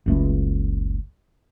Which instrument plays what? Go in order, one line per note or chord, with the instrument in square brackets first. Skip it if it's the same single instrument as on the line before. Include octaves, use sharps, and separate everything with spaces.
[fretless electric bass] F#1 C#2 A3